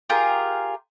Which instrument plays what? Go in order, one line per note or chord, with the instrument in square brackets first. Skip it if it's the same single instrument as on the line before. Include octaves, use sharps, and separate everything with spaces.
[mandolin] F4 G4 G#4 A#4